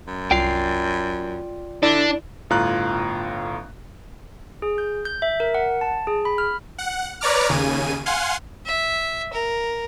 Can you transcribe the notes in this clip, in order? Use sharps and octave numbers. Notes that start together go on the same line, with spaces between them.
F#2
C2 F4 D5 G5 C7
D3 D4 E4
G1 A2 F4 F5 A#5 F#6
G#4
G6
G6
E5
A#4
F#5
A5
G#4
B5
F6
F#5
B4 C#5 D5 A#5 D6 F6
D#2 C#3 G#5 D#7
F5 F#5 G#5 C6
E5
A#4